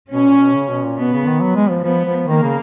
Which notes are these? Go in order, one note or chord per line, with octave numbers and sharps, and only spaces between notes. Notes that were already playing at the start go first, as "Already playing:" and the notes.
B2 C#4
A#2
B2
C#3
B2
A#2
B2 B3
C#3
D#3
F#3 B3
G#3
F3
F3 B3
F3
D#3 A#3
C#3